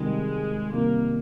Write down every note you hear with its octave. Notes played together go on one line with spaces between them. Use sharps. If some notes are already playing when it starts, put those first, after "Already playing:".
Already playing: C3 D#3 G3 G#3
C3 D#3 G3 A#3